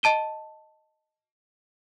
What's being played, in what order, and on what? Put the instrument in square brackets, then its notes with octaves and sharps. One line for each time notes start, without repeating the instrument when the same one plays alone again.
[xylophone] D#5 A5 D#7 G7